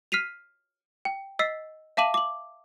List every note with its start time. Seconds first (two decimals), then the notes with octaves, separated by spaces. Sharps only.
0.12 F6 B6 C7 D#7 F7
1.05 G5
1.39 D#5 E6 B6 C7
1.97 E5 F5 A5 D6 D#7 F#7
2.14 D6 F#7